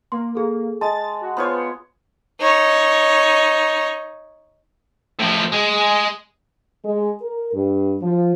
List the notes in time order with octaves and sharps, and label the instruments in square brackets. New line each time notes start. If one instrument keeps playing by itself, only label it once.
[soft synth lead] A#3 [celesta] C6
[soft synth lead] A#3 [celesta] G#4 A4
[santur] G#3 [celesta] A5 [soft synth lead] A6
[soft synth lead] F#4
[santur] B3 F4 C#5 [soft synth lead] C5
[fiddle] D#4 C#5
[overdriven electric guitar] A2 F3
G#3 G#4
[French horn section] G#3
A#4
G2
F3